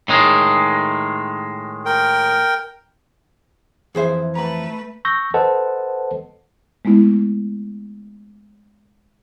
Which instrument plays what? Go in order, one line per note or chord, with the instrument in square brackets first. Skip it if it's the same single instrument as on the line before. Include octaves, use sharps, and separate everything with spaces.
[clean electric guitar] A2 D#3 G#3
[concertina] A#4 G5
[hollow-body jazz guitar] F2 E3 C5 [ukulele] G#4 E5
[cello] A3 B4 [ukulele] A#5 B5
[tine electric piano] C#6 E6 G6 A#6
A4 B4 C5 D#5 F#5 A5
[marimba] G#3 A3 B3 E4